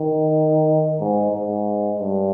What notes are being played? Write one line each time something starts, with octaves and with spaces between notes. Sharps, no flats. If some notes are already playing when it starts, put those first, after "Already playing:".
Already playing: D#3
G#2
G#2
G2